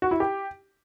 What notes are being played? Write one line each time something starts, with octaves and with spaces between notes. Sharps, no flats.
F#4
E4
G4